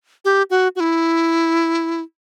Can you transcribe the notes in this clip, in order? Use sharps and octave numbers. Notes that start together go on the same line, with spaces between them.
G4
F#4
F#4
E4